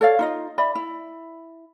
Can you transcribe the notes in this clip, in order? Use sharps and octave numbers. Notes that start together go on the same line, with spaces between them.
A4 C#5 D5 F5
D#4 F4 D#5
D5 E5 B5
E4